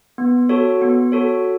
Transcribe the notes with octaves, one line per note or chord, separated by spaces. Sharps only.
B3
F#4 A4 C#5
B3
F#4 A4 C#5